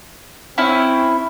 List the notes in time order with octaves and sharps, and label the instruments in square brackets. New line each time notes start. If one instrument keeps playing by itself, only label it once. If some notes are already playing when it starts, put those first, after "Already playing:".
[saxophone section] C4 [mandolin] C#4 E4